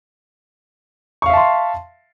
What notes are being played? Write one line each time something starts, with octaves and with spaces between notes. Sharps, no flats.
E5 F5 A5 C6 C#6